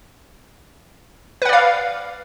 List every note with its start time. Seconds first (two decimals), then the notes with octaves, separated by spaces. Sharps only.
1.42 B4
1.45 F#5
1.49 D5
1.53 F5